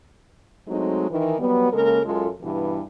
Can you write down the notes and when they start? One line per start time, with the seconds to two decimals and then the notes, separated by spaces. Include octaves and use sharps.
0.68 F#3 G#3 A3 C4 D#4
1.11 D#3 E3
1.39 F#3 G3 B3
1.72 C#3 G#3 A#3 A4 A#4
2.05 F#2 G#3 F4 A4
2.41 G2 B2 E3